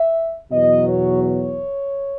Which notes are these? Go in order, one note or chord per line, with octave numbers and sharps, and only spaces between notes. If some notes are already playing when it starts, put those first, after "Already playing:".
Already playing: E5
E2 B2 F#3 D#5
C#5
C#5